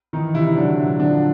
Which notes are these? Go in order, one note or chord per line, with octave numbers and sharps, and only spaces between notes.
D#3 E3 D#4
C3 E3 E4
D3 F#3 D4
A#2
D3 F3 D4